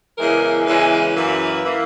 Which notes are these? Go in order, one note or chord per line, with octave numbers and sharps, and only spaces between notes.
E2 C#3 E3 G#3 A#4
E2 C#3 E3 G#3 B4
F#2 E3 A#3
E3 A#3